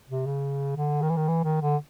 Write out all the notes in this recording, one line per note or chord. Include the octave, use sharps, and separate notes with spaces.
C3
C#3
D3
D#3
E3
D#3
E3
D#3
D3